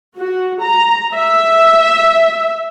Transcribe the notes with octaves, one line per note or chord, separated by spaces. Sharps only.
F#4
A#5
E5